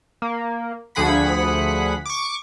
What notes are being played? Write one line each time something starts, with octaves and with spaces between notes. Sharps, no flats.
A#3
D2 F3 G#4 F#5 B5 B6
C#6 D6